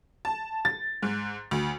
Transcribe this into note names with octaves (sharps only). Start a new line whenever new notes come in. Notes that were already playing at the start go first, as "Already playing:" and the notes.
A5
A6
G#2
D2